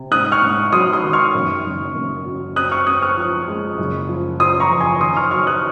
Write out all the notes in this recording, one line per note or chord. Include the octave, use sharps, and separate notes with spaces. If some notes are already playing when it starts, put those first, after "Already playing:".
Already playing: C3
G#2 D#6 F#6
C#6 F6
G#2
F#3 C6 D#6
C6 D#6
D#3
C#6 F6
F#2
F#1
F#2
F#3
C4 D#6 F#6
C#6 F6
C4 D#6 F#6
C#6 F6
F3
G#3
F#1
F3
F3 C6 D#6
A#5 C#6
F2
G#5 C6
D#3 C6 D#6
C#6 F6
F#3 C#6 F6
D#6 F#6